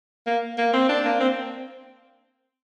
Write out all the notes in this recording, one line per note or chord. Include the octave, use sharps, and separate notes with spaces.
A#3
A#3
C4
D4
A#3
C4